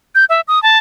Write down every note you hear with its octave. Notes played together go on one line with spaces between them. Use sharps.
G6
E5
D#6
A5